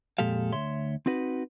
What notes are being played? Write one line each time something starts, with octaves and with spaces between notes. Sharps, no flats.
F2 A#2 G#3 G4 A4 F5
D2 C#5 E5 C6
C4 D#4 F#4 B4